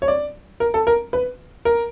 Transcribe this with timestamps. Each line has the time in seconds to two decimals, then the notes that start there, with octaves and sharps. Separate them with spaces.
0.02 C#5
0.08 D5
0.60 A#4
0.74 A4
0.87 A#4
1.13 B4
1.65 A#4